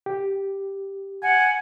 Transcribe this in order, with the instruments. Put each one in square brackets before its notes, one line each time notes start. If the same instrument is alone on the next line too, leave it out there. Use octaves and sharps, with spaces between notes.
[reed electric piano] G4
[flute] F#5 [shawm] G#5